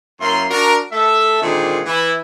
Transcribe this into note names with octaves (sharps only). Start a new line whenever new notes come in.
F#2 A#3 E4 A#4 C6
D4 F#4 A#4
A3 A4 E5
A#2 D3 D#3 G#3 C4 G#4
E3 E4